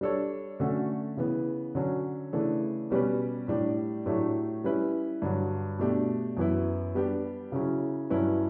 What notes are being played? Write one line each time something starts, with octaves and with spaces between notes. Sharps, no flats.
G3 D4 A4 C#5
D3 A3 C#4 F#4 A4
C#3 E3 B3
D3 F#3 C#4
C#3 E3 A3 D4 A4
B2 G3 C#4 G4 B4
A2 G3 D4 G4
A2 F#3 A3 D4 G4
G3 C#4 E4 B4
G2 D3 F#3
B2 A3 D4 G4
F#2 E3 B3 E4
G3 B3 D4 G4
C#3 F#3 C#4 E4
G2 F#3 C#4 E4 B4